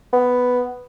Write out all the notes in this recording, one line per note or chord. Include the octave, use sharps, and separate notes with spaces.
B3